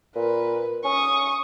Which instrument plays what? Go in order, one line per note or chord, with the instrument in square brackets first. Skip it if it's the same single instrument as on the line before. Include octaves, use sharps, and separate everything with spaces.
[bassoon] A#2 [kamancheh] B4
[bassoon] C#4 [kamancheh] C#6 D#6